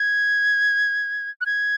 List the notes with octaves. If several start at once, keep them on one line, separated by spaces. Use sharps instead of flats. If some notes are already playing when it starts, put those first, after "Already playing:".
Already playing: G#6
F#6
G#6